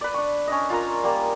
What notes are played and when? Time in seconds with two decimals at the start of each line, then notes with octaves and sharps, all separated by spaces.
0.01 B4 D5
0.14 D4 C#6
0.47 C#4 D4 D#5
0.70 F4 A#4 A#5
1.03 G3 A#3